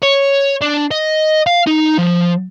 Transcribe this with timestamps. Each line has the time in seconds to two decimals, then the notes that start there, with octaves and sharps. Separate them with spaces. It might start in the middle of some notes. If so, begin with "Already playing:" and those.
0.02 C#5
0.61 D4
0.91 D#5
1.46 F5
1.67 D#4
1.98 F3